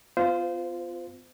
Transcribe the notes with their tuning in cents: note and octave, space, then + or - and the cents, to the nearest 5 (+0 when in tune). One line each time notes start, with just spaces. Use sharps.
B3 +30 F4 +0 C5 -20